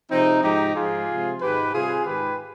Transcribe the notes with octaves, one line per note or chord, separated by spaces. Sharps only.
C3 F3 G#3 C4 D#4
G#2 F3 G#3 D#4 G4
G#2 F3 G#3 F4 G#4
C3 F3 G#3
G#2 D#3 G#3 G4 B4
C3 G3 F4 G#4
G#2 D#3 G#3 G4 B4